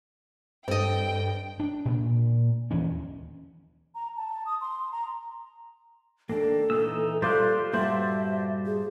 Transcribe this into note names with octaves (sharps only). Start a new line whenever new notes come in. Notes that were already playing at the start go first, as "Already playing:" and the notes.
G2 C4 A4 D#5 G5
D4
A#2
D#2 E3 C#4
A#5
A5
D#6
C6
A#5
D#2 A#3 D4 A4
A#2 E3 D#4 E6
G3 F4 A4 C5 D5 F5 F#6
G2 A#2 G3 F#4 A4 C5 E5
G#4